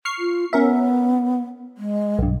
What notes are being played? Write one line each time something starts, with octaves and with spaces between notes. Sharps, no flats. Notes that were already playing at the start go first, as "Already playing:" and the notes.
C#6 F6 C7
F4
B3 C#4 A#4 E5
G#3
B1 G2